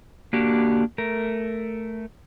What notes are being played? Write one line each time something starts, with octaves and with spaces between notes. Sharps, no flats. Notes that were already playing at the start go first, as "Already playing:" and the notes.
A#3 D4 F#4 G4
A3 A#4